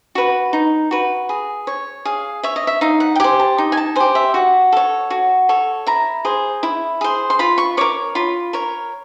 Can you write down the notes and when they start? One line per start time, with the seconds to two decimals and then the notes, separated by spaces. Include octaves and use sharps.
0.15 F#4 B4
0.53 D#4
0.91 F#4 B4
1.29 G#4
1.67 C#5
2.05 G#4 F5
2.43 C#5 E5
2.56 D#5
2.67 E5
2.81 D#4 F5
3.00 F#5
3.15 G5
3.20 G4 C5 G#5
3.40 A5
3.58 D#4
3.72 G#5
3.77 A5
3.96 G4 C5 G#5
4.15 E5
4.34 F#4 F#5
4.72 A4 C#5
5.10 F#4
5.49 A4 C#5
5.87 E4 A#5
6.25 G#4 C5
6.63 E4
7.01 G#4 C5
7.30 C6
7.39 F4 B5
7.58 C#6
7.77 A#4 C#5 D6
8.15 F4 B5
8.53 A#4 C#5